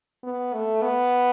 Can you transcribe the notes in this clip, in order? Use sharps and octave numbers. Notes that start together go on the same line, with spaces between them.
B3
A3
B3